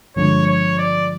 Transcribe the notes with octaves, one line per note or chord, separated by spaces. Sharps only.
G2 D3 F3 G#3 C#5
C#5
D5